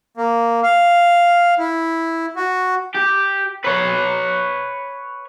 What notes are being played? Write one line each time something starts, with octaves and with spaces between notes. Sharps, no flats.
A#3
F5
E4
F#4
G4
B4 C#5